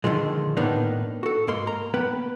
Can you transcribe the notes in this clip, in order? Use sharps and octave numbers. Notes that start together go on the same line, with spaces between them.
A#2 D3 D#3 F3 G#3
A2 D#3 A#3 B3 D4 D#4
F#4 A4
G#2 A#3 C6
A#5
A#3 B3 B4 G5